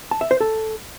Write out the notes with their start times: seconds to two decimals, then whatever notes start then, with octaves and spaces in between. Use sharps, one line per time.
0.11 A5
0.21 E5
0.31 C5
0.40 A4